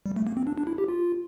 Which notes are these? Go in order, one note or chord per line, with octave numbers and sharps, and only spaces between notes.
G3
A3
A#3
C4
D4
D4
E4
G4
F4